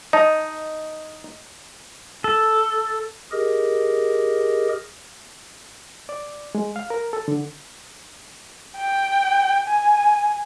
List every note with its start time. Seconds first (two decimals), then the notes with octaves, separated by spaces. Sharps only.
0.13 D#4 D#5 A5
2.24 A4
3.32 G4 G#4 A#4 D#5
6.09 D5
6.55 G#3
6.76 F5
6.90 A#4
7.13 A4
7.28 D3
8.77 G5
9.67 G#5